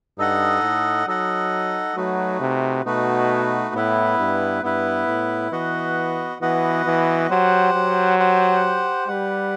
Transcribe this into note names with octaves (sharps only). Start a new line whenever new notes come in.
G2 D#4 A4 D#5 F#5
A2
F#3 D#4 A4 D#5 F#5
F#3 A3 D#4 F#4 B4
C3
B2 A3 D#4 F#4 B4
A2 B3 E4 B4
G2
G2 B3 E4 B4
A2
E3 B3 F#4 B4 D#5 F#5
E3 B3 F#4 B4 D#5 F#5
E3
F#3 G4 C5 F#5
F#3
G4 C5 F#5
G3 G4 B4 F#5